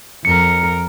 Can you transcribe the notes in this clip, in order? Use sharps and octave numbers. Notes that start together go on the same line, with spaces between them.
F2 A#4 C#7